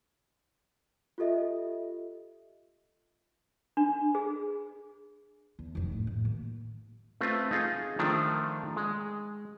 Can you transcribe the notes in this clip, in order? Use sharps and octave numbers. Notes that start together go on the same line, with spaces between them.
F4 G4 A4 D#5 E5
D4
G#4
E2
F1 F2
A2
A1
D#2
A3 C4 F4 B4
D#4 F4 G#4
D#3 F3 A3 D4
G#3